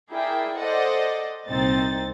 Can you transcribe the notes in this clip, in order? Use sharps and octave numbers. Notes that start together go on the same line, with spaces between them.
E4 G#4 A#4 D5 E5 G5
A4 C5 D5 D#5 F#5
C2 A#2 C4 D#4 A6